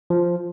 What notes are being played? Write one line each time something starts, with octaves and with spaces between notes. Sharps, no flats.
F3